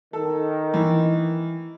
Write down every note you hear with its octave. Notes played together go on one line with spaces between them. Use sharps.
D#3 A4
E3